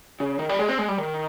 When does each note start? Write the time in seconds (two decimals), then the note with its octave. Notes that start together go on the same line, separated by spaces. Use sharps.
0.20 C#3
0.39 D#3
0.49 G3
0.59 G#3
0.69 C4
0.79 G#3
0.88 G3
0.98 D#3